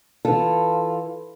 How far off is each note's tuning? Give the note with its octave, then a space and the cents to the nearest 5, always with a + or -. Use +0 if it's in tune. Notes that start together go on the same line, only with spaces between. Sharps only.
E3 +0 F4 +0 A4 +0